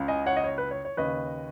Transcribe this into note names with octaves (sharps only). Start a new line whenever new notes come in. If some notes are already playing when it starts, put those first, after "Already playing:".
Already playing: C#2 C#3
D#5 G#5
C#5 F#5
D#5
C#5
B4
C#5
C#5
D#2 C#3 B4 D#5